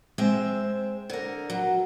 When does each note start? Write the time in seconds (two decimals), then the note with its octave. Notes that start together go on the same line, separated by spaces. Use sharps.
0.18 G#3 C4 E5
1.10 D3 A#4
1.50 F#3